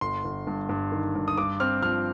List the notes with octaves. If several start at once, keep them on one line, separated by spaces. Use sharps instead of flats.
G1 C6
G1
G2
G2
D#3
G2
D#6
G2 D6
C4 F6
F3 F6